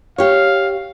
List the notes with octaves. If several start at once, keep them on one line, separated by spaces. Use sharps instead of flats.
G4 C#5 F5